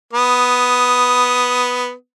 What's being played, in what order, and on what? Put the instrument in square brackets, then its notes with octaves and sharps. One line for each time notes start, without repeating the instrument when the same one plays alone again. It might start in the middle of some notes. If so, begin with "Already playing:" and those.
[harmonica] B3 D#6